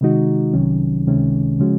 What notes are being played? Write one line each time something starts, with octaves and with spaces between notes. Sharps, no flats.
C3 D#3 G#3 D#4 F#4
C2 C3 D#3 F#3 C#4
C#2 C3 D#3 G#3 C#4
C#3 F3 G#3 C#4 F#4